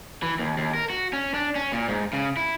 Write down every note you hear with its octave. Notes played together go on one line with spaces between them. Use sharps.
E3
D#2
D#2
A#4
F#4
C#4
D4
C#4
A#2
G#2
C#3
E4